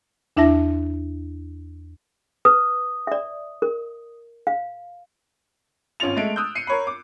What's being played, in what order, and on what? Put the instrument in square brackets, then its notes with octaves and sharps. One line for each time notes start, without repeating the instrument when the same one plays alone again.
[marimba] E2 D4 E4 E5 A5 A#6
[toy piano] B4 [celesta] D#6
[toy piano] D5 E5
A#4
F5
[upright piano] G#1 C#4 F4 A6 F7
G#3 A3 D7
D#6 E6 F#6 G6
C7 C#7 D#7
A#4 C#5 B5
D6